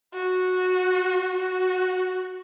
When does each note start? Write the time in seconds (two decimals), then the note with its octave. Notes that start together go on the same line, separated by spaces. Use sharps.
0.13 F#4
1.37 F#4